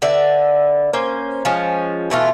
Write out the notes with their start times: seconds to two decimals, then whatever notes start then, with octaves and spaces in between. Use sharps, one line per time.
0.02 D3 B4 D5 E5
0.93 A#3 C#4 C5
1.45 F3 G#3 C#4
2.10 B2 E3 A3 F4